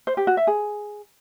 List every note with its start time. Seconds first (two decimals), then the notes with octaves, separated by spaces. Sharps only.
0.07 C5
0.17 G4
0.27 F#4
0.37 E5
0.47 G#4